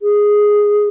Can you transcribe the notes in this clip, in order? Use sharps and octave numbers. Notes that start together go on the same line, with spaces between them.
G#4